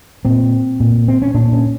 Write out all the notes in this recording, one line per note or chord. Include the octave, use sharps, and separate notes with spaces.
A#2 C4
A#2
C4
C#4
A#2 D4
C#4